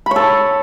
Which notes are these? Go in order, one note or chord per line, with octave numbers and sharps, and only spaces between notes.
A4 C#5 B5